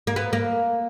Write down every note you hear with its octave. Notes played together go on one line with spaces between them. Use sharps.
A#3
B3
A#3